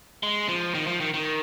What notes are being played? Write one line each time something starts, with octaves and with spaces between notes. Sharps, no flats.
G#3
F3
D#3
F3
D#3
D#3